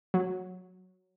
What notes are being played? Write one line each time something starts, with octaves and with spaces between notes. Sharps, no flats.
F#3